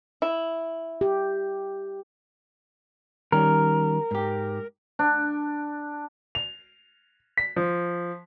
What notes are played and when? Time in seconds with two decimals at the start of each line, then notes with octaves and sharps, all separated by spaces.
0.22 E4
1.01 G4
3.32 D#3 G3 C#4 A#4
4.11 G#2 G4
4.99 D4
6.35 F7
7.38 B6
7.56 F3